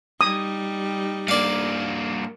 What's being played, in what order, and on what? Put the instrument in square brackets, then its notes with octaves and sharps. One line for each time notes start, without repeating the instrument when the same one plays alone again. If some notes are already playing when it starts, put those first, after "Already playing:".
[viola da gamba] G3 D#4 [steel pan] D#6
[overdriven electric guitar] G2 A#3 [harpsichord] D5 F5